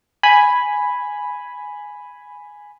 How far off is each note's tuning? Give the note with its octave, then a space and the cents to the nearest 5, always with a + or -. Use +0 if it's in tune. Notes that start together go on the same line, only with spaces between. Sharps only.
G#5 +0 B5 +0